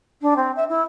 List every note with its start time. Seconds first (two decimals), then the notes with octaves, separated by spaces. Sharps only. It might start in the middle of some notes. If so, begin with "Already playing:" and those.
0.21 D4
0.36 C4
0.56 E5
0.69 E4